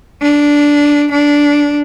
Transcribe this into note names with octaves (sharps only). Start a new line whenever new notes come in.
D4
D4